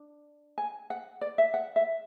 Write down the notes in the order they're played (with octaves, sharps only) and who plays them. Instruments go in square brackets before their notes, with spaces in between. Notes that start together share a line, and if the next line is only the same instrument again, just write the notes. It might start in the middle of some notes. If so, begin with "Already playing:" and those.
Already playing: [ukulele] D4
G#5
F#5
D5
E5
F#5
E5